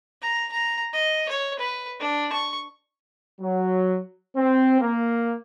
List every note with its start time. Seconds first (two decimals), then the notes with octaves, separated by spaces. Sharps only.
0.22 A#5
0.52 A#5
0.93 D#5
1.29 C#5
1.59 B4
2.00 D4
2.33 C#6
3.41 F#3
4.37 C4
4.81 A#3